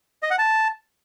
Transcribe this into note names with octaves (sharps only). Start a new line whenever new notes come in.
D#5
F#5
A5